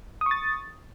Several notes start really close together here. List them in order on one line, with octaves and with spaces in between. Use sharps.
D#6 C#6 A6